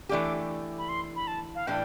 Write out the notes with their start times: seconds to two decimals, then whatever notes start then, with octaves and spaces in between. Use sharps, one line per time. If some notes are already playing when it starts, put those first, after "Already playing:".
0.09 E3 A3 D4 G4 D6
0.78 B5
0.89 C6
1.16 B5
1.27 A5
1.55 F5
1.67 A2 E3 G3 D4 G5